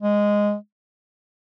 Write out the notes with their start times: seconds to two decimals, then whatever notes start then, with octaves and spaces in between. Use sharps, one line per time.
0.02 G#3